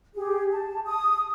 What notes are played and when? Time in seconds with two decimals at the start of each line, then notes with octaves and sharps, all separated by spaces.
0.15 G4 G#4
0.52 A5
0.85 D#6